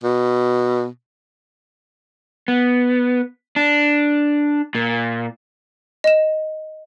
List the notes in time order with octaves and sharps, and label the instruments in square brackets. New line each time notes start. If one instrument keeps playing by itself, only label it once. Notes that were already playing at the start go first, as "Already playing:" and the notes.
[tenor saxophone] B2
[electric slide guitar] B3
D4
A#2
[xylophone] D#5 E7